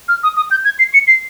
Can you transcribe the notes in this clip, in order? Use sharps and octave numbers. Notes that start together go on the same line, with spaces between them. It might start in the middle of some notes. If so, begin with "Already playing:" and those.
F6
D#6
D#6
G6
G#6
C7
C#7
C7